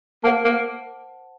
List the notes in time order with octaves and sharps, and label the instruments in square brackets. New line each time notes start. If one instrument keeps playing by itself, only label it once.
[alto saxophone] A#3 [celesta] C5 F#5 A5
[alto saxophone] A#3